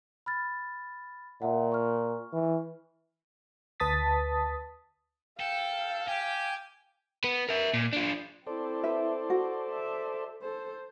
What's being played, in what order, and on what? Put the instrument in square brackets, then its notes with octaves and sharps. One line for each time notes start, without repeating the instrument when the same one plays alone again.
[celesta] B5 F6 A6
[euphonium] A#2 [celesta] E5 F#5
[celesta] C#6 F6
[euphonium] E3
[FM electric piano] D2 B4 A5 D#6 A6 B6
[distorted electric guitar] A4 [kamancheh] F5 [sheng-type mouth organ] G5
[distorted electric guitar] G4 [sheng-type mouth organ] G5 G#5
[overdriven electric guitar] B3 B4
A#4 E5
A#2
D4 F4
[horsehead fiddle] C4 E4 [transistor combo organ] A4 C5 D5
[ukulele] B4 E5
F#4
[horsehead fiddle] E5
A4 C5